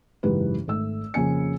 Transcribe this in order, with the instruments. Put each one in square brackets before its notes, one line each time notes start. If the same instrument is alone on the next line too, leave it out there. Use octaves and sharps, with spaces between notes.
[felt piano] F#1 G#2 E3 G4 B4
G#1 A3 E6
F2 C#3 A#3 G#5 C#7